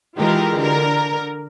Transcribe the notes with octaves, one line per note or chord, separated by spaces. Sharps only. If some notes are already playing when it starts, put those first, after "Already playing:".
D#3 E3 G#3 F4 G4 A#4
D3 A#4